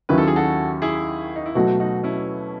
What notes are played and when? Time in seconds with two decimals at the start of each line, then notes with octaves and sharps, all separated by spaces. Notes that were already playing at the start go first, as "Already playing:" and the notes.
0.09 D#2 D#3 F#3 C#4 E4 B4
0.18 A4
0.27 G#4
0.36 F#4 A4
0.82 E4 G#4
1.36 D#4
1.46 E4
1.55 B2 F#3 A3 D#4 F#4
1.80 D#4 F#4
2.04 C#4 E4